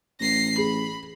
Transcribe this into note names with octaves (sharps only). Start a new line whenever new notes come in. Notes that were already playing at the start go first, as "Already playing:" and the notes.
A1 A#6 C7
G#4 B5